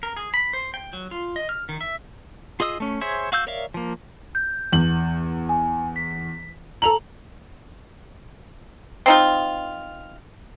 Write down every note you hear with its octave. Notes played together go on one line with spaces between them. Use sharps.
A#4
G#4
B5
C5
G5
F#3
F4
D#5
F6
D#3
E5
F4 G#4 D#5 D#6 E6
A3 C#4
G#4 C5 C#5 E5
F#4 F5 E6 G6
A#4 C#5 D5 E5 F5
F3 A#3
G6
E2 F#7
G#5
B6
A4 A#5 F7 F#7
C4 D#4 F4